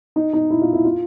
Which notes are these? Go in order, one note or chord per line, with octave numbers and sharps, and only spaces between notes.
D#4
D#4
E4
F4
E4
F4